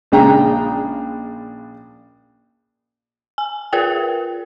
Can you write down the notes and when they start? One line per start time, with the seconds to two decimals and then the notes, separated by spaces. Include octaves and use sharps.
0.12 A#1 C#3 G#3 D4 G5 A#5
3.38 G#5
3.73 F4 G#4 A#4 B4 G5